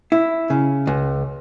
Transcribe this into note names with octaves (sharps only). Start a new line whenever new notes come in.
E4
C#3
C#2